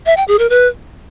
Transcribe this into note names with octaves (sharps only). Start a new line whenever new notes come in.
E5
G5
G#4
A#4
B4